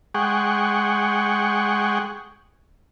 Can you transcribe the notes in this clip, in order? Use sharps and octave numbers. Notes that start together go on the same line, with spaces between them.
G#3 G#4 F#5 G5 C#6